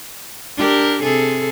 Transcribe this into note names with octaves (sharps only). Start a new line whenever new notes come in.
D4 G4 A#4
C3 G#4 A4